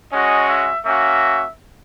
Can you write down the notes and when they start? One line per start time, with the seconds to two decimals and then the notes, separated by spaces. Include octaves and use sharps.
0.13 G#3 C#4 F#4 D#5
0.49 E5
0.85 A#3 C#4 F#4 E5